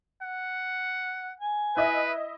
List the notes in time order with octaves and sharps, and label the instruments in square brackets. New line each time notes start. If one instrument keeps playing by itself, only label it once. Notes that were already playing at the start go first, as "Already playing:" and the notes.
[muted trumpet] F#5
[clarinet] G#5
[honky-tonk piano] E4 D#5 E5 [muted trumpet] B4